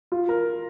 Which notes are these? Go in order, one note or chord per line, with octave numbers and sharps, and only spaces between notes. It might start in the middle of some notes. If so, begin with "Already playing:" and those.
F4
A#4